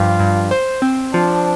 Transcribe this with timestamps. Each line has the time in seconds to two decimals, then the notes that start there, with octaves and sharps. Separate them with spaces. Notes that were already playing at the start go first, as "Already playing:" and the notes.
Already playing: G2 F3 F4 G4
0.20 G2
0.51 C5
0.82 C4
1.13 F3 D4